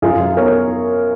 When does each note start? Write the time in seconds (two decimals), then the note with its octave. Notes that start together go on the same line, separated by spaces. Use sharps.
0.02 F#2 F4 G#4
0.20 F#2
0.37 B3 A#4 C#5